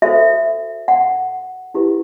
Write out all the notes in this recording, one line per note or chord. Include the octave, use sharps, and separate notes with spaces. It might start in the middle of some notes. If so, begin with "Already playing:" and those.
F#4 A4 C5 E5
F#5
E4 G4 B4